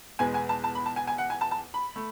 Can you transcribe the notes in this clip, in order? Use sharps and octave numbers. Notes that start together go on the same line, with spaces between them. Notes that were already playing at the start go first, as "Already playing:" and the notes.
E2 B2 G#3 B3 G#5
G#5
A5
A5
B5
A5
G#5
G#5
F#5
G#5
A5
A5
B5
A3